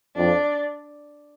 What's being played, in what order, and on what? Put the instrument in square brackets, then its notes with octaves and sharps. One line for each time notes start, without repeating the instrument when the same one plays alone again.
[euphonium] F2 [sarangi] D4